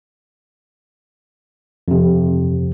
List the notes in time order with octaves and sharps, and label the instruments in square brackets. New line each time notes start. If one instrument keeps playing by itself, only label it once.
[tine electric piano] F2 C3